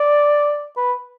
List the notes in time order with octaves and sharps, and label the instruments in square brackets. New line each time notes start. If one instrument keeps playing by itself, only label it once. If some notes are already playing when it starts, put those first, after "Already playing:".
Already playing: [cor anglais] D5
B4